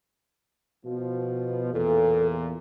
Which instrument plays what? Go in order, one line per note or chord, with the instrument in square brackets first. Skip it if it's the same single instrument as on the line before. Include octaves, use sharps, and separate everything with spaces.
[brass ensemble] B2 F3
[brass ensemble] E2 A#2 [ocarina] A4